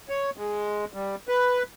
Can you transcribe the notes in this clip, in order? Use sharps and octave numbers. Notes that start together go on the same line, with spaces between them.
C#5
G#3
G3
B4